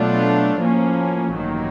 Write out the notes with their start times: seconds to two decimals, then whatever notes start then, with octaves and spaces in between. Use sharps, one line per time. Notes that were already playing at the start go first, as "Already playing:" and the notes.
Already playing: B2 F#3 A3 D4 F4
0.59 A2 F3 A#3 C#4
1.34 A1 G2 D#3 F#3 A#3